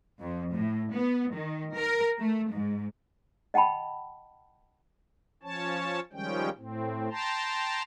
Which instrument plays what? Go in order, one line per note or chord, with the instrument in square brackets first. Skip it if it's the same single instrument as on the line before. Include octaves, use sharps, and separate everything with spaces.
[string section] F2
A2
B3
D#3
A#4
A3
G#2
[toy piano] D#5 F#5 G5 A5 B5
[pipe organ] F3 C#4 C#5 A5
D#3 F3 G3 G#3 C#4 G5
A2 C4
G5 A5 A#5 C6